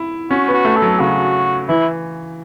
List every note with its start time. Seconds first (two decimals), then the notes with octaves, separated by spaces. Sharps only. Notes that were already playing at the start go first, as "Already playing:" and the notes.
Already playing: E4
0.30 C#4 F#4
0.48 B3
0.54 F#4
0.65 A3
0.77 A4
0.82 F#3
1.00 C#3 F#4
1.69 E3 E4